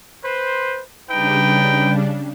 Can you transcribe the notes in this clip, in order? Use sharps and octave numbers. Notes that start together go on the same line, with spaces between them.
B4 C5
C#3 G3 D4 D#4 B4 G5